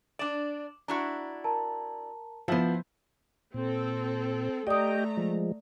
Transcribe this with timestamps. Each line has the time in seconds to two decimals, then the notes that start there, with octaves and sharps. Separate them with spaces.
0.19 D4 D5 D6 E7 F#7
0.88 D4 E4 F#4 A#5
1.44 A#4 A5 A#5
2.48 F3 B3 E4 C5
3.54 A#2 C4 A4
4.67 A3 G4 D5 D#5 G5 A#5 D#6
5.17 F3 G#3